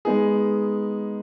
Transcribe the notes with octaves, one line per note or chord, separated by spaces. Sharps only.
G#3 B3 D#4 G#4